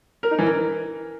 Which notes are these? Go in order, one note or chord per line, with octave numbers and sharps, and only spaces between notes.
A#4
D#4
E3
A#4